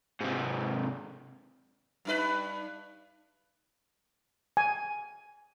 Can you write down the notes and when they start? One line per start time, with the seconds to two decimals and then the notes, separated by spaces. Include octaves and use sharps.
0.20 G#2 C3
2.05 G2 D#4 B4
4.57 G#5